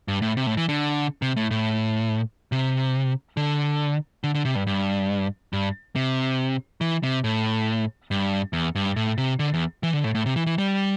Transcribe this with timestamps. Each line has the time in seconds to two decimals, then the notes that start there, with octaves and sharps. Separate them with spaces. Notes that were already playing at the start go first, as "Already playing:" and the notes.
0.08 G2
0.22 A2
0.37 C3
0.46 A2
0.57 E3
0.69 D3
1.22 C3
1.36 A2
1.51 A2
2.52 C3
3.37 D3
4.24 D3
4.35 D3
4.45 C3
4.55 G2
4.67 G2
5.53 G2
5.96 C3
6.81 E3
7.03 C3
7.24 A2
8.11 G2
8.53 E2
8.75 G2
8.96 A2
9.18 C3
9.39 D3
9.54 E2
9.83 E3
9.93 D3
10.04 A2
10.15 A2
10.26 C3
10.36 E3
10.46 E3
10.58 G3